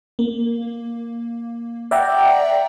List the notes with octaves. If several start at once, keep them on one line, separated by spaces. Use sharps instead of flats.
A#3
D5 E5 F#5 G5 A#5